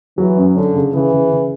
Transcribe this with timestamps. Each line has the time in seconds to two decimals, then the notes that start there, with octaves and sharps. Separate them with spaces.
0.18 E3 F#3
0.37 F#2
0.56 D3 C#4
0.74 C#3
0.93 C#3 E3
1.12 C#3
1.31 C#3